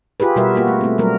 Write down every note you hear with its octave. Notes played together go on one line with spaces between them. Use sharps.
F4 G4 G#4 B4
B2 G3 F#4 A#4 B4 E5
A#3 F4 F#4
A3
A3 C4
F#3 G3 A3 A#4